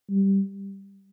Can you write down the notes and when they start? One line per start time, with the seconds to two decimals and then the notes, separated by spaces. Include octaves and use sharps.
0.11 G3